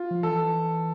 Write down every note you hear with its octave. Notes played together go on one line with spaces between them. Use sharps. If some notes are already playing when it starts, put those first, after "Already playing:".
Already playing: F4
F3
E3 A4